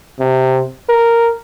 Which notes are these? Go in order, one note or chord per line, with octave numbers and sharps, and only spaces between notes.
C3
A#4